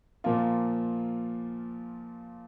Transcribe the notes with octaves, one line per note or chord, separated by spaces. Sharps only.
A#2 F3 A#3 F4